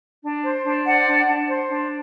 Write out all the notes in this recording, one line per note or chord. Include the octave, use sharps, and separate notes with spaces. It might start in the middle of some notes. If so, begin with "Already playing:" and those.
D4
C5
D4
C5 D5 F#5
D4
D4
C5
D4